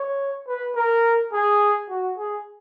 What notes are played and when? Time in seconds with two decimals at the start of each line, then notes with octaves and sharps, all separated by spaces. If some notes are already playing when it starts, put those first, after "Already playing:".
Already playing: C#5
0.48 B4
0.75 A#4
1.33 G#4
1.89 F#4
2.18 G#4